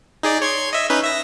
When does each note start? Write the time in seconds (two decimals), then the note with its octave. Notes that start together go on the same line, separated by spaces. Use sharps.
0.23 D#4 G#4 D5
0.42 C#5 C6 G#6
0.73 D#5 E5
0.90 C#4 D#4 B4
1.04 E5 A#6